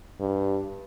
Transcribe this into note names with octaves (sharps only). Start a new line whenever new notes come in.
G2